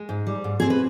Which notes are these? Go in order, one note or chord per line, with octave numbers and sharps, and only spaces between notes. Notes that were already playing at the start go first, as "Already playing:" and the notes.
Already playing: G#3
G#2
G3
G#2
C4 G#4
B4